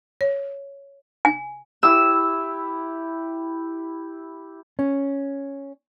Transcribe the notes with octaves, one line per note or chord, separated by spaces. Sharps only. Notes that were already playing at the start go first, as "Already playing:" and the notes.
C#5
G#5
E4 G4 E6
C#4